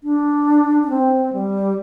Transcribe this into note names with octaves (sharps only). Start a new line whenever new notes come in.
D4
D4
C4
G3